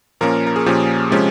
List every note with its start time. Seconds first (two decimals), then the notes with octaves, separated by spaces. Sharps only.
0.21 A#2 F3 A#3 C#4 A#4
0.47 A#4
0.56 G#4
0.66 A#2 F3 A#3 C#4 G4
1.11 C3 F3 G#3 C#4